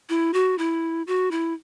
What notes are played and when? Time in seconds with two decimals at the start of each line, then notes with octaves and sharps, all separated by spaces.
0.09 E4
0.33 F#4
0.58 E4
1.07 F#4
1.31 E4